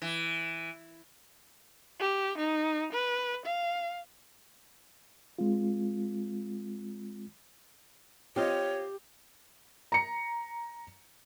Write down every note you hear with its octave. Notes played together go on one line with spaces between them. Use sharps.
E3
G4
D#4
B4
F5
G#3 C4 F4
C4 F4 G4 C#5 D#5
A#5 C#7